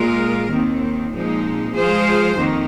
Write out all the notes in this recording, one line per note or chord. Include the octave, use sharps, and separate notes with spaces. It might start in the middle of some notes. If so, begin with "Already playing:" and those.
Already playing: A#2 G#3 F4 A#4
D#2 D#3 C4
A#2 F3 G#3 C4 D#4
F3 G#3 F4 G#4 C5
F2 D#3 A#3 D#4